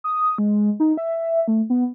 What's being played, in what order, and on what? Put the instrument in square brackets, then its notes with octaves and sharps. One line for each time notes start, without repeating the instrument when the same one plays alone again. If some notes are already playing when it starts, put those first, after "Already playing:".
[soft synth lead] D#6
G#3
D#4
E5
A3
B3